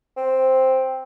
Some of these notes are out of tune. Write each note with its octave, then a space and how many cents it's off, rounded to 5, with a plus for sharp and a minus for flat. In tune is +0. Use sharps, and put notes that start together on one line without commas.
C4 +0